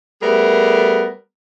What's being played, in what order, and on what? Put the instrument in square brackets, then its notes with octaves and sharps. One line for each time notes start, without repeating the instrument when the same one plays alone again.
[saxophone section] G3 A3 B3 G#4 A#4